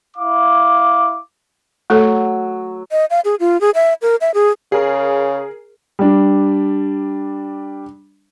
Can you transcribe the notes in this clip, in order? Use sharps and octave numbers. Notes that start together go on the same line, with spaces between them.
E4 F5 D6
F#3 A3 A4 E6
D#5
F5
G#4
F4
G#4
E5
A#4
E5
G#4
C#3 G#4 A#4
G3 D4